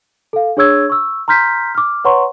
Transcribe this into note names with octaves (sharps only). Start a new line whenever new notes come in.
A4 F5
D4 G#4 C#5 C#6 E6 G#6
C#6 E6
A#5 C6 F6 G6 B6
D6 F6
B4 C#5 F#5 A#5 C6 C#6